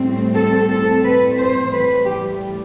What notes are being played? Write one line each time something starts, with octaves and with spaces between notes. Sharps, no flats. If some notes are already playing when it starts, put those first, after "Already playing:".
Already playing: A2 G3 C4
A4
A4
B4
C5
A2 E3 G3 B4
G4